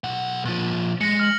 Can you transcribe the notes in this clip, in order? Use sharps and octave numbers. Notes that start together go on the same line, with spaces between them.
B1 F#5
A#2 F3
G#3 A#6 C#7
F6 F#7